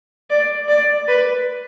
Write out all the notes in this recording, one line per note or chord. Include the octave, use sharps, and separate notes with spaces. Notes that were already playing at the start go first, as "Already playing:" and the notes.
D5
D5
B4